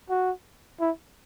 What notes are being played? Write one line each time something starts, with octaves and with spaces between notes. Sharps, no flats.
F#4
E4